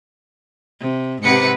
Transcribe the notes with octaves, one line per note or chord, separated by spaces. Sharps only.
C3
G#2 C3 G#3 B4 F#5 C#7